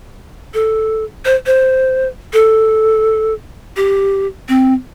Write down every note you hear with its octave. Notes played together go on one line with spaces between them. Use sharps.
A4
C5
C5
A4
G4
C4